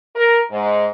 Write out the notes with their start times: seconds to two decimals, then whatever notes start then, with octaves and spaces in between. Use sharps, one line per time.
0.16 A#4
0.51 G#2